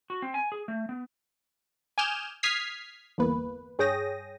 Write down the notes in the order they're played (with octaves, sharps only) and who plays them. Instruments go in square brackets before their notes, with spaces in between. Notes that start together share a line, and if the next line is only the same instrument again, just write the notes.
[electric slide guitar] F#4
C4
G#5
G#4
A3
B3
[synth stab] G#5 D6 D#6 F6 G6 E7
D#6 F6 G#6 B6 C7
G1 E2 A#3 B4
G2 G#4 C#5 G5 D#6 A#6